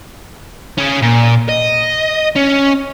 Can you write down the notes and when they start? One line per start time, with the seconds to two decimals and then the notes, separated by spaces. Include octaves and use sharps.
0.78 C#4 G#4
1.03 A#2
1.49 D#5
2.36 C#4